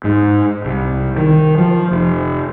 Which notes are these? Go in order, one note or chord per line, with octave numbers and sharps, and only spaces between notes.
G#2
C2
D#3
F3
F1